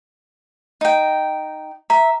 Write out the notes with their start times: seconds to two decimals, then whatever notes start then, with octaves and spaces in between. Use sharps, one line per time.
0.81 D#4 G5
1.90 E5 A#5